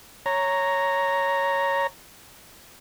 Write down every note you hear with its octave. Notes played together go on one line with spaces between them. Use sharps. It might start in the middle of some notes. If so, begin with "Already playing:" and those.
C#5 A#5